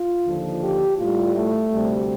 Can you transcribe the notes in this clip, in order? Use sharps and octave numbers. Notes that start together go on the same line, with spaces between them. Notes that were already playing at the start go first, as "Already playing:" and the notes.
Already playing: F4
D#2 D3 F3
G4
A2 G3 F4
A3
D2 C3 G3